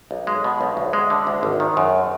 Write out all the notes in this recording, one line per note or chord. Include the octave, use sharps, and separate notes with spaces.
B1
G#3
B2
B1
D2
G#3
D3
D2
G#1
D#3
F#2